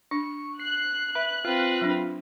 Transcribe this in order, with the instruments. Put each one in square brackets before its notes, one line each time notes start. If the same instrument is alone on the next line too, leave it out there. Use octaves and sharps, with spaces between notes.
[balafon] D4 [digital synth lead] C#6
[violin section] F#6 [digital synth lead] C7
[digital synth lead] B4 [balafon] E5
[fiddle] C4 B4 [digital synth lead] F4
[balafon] F#3 D4